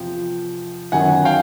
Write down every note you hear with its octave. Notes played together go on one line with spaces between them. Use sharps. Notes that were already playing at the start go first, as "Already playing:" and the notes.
Already playing: E2 C3 F3 G5
G1 F#2 D#3 F#3 F#5 G#5
F5 G5